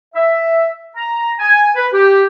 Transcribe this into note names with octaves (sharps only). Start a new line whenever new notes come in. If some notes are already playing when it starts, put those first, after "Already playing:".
E5
A#5
G#5
B4
G4